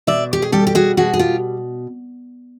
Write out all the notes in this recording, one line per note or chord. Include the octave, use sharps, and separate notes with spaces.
B2 D5 E5
G4
G#4
G3 G4 A4
G4
F#4 G#4
B2 F#4 G#4
G#4
F4 G4